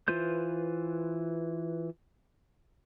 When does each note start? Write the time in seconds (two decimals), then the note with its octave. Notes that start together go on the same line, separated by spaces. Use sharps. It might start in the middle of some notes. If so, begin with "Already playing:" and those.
0.08 E3 F4 B4 C5 G6